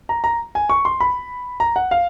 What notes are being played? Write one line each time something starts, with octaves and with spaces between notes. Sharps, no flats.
A#5
A#5
G#5
C#6
C6
B5
A#5
F#5
F5